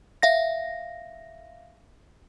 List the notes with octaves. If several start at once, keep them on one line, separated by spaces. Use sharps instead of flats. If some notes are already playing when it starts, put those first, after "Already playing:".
E5 F5 A#6